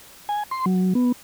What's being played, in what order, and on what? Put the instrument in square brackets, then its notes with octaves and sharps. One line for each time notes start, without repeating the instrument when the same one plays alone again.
[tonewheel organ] G#5
C6
F#3
B3